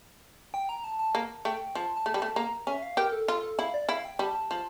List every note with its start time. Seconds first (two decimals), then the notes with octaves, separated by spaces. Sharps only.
0.54 G5
0.69 A#5
0.84 A5
0.99 A5
1.15 A#3
1.45 A3 G5
1.75 F3 A5
1.97 A5
2.06 A3
2.14 G3
2.17 A5
2.22 A3
2.36 A#3 A#5
2.67 C#4 E5
2.82 F5
2.97 G4 A#4
3.12 A4
3.28 F4 A4
3.43 A4
3.59 E4 F5
3.74 D5
3.89 E4 F5
4.05 G5
4.19 G3 A5
4.35 A5
4.51 F3 A5